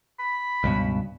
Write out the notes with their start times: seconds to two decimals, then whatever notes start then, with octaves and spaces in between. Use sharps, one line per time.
0.19 B5
0.64 C#2 G2 B2